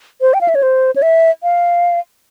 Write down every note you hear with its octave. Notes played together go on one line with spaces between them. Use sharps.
C5
G5
F5
E5
C#5
C5
C#5
E5
F5